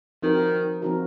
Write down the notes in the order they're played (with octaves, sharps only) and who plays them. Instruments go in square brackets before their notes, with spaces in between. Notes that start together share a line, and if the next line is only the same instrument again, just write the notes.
[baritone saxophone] D#3 [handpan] F3 C4 D#4 F#4 A#4
[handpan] F3 C4 D#4 F#4 A#4